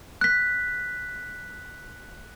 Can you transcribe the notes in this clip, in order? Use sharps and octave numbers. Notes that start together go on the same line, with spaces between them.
F#6 B6